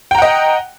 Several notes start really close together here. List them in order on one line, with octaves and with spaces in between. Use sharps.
G5 A#5 F#5 D#5